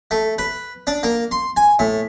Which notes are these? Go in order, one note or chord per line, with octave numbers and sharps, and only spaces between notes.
A3
B4
D4
A#3
C6
G#5
A2